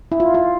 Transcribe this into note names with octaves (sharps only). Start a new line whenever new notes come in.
E4
F4
F4